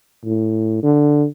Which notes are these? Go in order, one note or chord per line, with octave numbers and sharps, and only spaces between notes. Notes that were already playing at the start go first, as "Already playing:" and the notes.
A2
D3